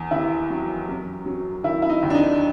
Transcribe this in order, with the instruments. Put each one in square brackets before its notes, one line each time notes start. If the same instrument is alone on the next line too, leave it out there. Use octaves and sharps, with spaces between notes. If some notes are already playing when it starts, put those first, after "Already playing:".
Already playing: [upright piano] E2
D#2 E4
F#3
F#2
F#3
D#3 E4
E4
D#4
D#2
D4
D#4